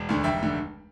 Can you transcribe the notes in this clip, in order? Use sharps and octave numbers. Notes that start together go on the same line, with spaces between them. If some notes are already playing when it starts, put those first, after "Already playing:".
Already playing: E1
D2 D3
F1 E5 G5
D3